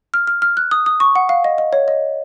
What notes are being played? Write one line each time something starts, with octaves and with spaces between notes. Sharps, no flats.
F6
F6
F6
F#6
D#6
D#6
C#6
F#5
F5
D#5
D#5
C#5
D#5